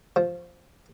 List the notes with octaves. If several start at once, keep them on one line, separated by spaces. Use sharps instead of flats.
F3